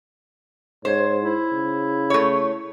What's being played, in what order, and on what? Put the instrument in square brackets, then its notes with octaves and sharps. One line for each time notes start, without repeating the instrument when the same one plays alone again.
[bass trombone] G#2 [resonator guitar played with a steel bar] C5 [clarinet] C#5
[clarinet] E4
[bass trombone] C#3
[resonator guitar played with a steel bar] A3 C#5